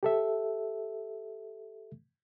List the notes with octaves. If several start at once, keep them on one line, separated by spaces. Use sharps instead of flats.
G4 A4 E5